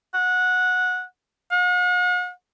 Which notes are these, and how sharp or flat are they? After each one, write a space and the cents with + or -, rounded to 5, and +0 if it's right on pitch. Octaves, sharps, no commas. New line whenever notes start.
F#5 -15
F#5 -45